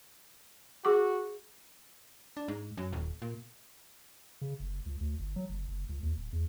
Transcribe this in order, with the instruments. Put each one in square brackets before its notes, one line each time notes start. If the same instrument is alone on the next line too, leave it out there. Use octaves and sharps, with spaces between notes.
[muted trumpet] F#4 [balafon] G#4 C#6 D6
[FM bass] D4
G#2
F#2
D#1
A#2
[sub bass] C#3
F#1
C#2
D2
G1
F#3
F#1
F#1
C#2
D#2
D1
E2